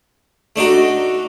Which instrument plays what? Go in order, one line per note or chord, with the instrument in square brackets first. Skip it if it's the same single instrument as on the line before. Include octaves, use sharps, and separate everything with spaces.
[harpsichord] A3 D4 D#4 F#4